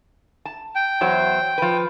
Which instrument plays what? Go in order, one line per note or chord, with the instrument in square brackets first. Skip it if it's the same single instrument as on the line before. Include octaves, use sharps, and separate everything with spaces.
[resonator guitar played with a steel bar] A5
[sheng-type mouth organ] G5
[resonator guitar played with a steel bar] E2 F#3 C5
F3 B4